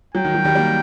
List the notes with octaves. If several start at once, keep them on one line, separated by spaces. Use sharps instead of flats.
F#3 G5
D#3
F#3
D#3 G3
G3 A#3